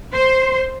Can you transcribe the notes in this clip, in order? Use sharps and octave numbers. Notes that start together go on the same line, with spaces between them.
C5